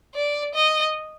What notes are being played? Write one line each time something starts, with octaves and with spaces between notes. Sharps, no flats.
D5
D#5